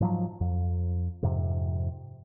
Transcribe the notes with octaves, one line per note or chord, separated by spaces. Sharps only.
G#2 F3 F#3
F2
F2 G#2 C3